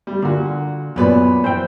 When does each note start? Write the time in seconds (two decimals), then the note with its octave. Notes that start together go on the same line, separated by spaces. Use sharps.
0.07 G3
0.22 A#2 D3 F#4
0.96 F#2 A#2 F#3 B3 B4 D5
1.44 E3 C5 G5